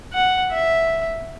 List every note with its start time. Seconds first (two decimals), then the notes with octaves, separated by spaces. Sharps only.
0.13 F#5
0.51 E5